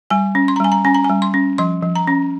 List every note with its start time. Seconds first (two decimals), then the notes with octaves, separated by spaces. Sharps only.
0.10 G3 G#5
0.35 C#4
0.48 C6
0.56 A#5
0.60 G3 G#5
0.72 A#5
0.85 C#4 G#5
0.94 A#5
1.04 G3 G#5
1.22 C6
1.34 C#4
1.58 F3 C6
1.83 F3
1.95 A#5
2.07 C#4